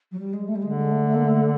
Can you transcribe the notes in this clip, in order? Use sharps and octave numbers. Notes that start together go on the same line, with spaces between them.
F#3
G3
G#3
A3
G3
D3 G#3
G#3
A3
A3
A#3
A3